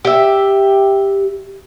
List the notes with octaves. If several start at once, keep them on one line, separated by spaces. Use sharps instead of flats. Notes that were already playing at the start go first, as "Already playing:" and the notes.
G4 E5